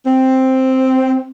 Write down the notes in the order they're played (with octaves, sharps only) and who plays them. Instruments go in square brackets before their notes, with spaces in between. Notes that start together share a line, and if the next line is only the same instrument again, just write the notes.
[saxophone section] C4